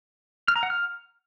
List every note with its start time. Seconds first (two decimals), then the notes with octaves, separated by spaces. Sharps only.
0.48 F6
0.56 A#5
0.63 F#5
0.70 F6